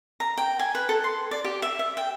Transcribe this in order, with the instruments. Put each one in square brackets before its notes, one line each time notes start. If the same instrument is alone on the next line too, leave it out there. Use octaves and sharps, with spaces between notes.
[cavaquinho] A#5
G5
G#5
B4
A4
C6
D5
G4
E5
E5
G5